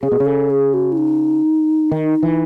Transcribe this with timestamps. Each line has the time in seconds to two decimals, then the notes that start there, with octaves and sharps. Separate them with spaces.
0.02 C#3 G#4
0.12 B2
0.20 C#3
0.26 A4
0.50 G#4
0.74 F#4
0.92 E4
0.97 D#4
1.92 D#3
2.23 E3